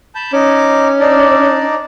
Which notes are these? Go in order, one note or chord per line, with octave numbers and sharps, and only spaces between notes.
A5 B5 G6
C#4 D#4 D6
D4 D#4 D5